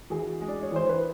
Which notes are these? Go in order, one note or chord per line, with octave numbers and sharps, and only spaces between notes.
E3 F#4 G#4
G#3
D5
C#5
E3 C5
B4